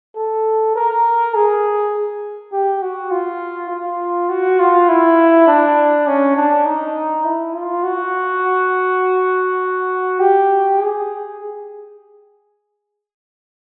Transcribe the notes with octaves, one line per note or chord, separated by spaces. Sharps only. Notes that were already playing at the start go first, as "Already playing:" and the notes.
A4
A#4
G#4
G4
F#4
F4
F4
F#4
F4
E4
D4
C#4
D4
D#4
E4
F4
F#4
G4
G#4